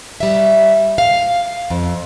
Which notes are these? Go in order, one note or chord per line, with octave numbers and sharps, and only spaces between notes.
G3 E5
F5
F2